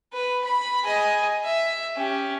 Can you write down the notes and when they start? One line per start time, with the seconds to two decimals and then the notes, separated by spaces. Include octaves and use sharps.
0.13 B4
0.45 B5
0.85 G#4 D#5
1.44 E5
1.97 C#4 G4